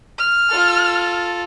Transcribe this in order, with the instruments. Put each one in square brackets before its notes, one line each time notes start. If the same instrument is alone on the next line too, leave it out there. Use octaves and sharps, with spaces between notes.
[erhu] F6
[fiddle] F4 A4